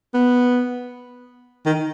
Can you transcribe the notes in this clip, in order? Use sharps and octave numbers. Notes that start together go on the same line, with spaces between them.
B3
D#3